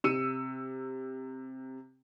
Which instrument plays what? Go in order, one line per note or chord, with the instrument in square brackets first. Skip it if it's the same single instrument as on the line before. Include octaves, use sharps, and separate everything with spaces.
[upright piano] C3 E6 C#7 D#7